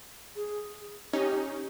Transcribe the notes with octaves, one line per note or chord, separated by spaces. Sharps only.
G#4
C#4 D#4 G4